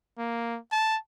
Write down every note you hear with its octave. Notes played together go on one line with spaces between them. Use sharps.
A#3
A5